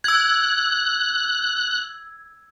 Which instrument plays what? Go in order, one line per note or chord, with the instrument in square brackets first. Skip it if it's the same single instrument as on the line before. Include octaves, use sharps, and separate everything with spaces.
[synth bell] E6 G#6 [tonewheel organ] F#6